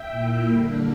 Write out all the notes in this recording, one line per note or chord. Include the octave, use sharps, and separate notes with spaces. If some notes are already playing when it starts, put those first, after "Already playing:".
Already playing: E5 G5
A#2 A#3 E4
D3 G3 A#3 D4